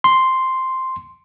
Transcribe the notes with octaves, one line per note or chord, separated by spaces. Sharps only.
C6